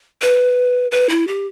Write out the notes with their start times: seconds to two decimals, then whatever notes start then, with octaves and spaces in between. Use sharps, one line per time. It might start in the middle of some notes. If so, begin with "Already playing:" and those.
0.22 B4
0.91 B4
1.09 E4
1.28 G4